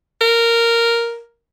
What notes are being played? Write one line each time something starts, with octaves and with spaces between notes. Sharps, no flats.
A#4